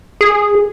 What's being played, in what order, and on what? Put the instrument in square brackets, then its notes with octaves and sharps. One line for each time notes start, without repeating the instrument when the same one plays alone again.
[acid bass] G#4